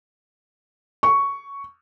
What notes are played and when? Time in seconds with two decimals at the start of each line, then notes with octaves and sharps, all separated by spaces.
1.03 C#6